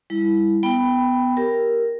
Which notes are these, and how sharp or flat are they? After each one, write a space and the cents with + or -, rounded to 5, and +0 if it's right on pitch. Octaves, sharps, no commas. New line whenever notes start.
G3 +25 E4 +0
B3 +10 G5 +0 B5 +0
G4 +0 A#4 +0